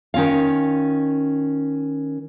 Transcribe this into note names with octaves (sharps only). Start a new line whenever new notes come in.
D#3 C#4 F4 F5